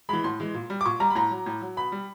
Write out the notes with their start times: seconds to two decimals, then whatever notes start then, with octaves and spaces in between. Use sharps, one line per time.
0.09 E3 G#3 B5
0.24 A2 C6
0.40 E3 G#3
0.54 A#2
0.70 G3
0.81 D6
0.85 A#2 C#6
1.00 G3 A#5
1.10 B5
1.15 A2 A#5
1.31 F#3
1.46 A2
1.62 F#3
1.77 B2 B5
1.92 G3